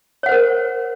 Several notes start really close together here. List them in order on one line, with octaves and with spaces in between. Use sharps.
C#5 F#5 C5 A#4